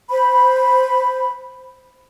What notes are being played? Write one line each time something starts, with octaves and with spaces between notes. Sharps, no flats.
C5 B5